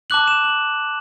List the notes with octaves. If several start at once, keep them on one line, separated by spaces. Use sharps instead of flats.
A5 D6 F#6 F#7
E7
F#7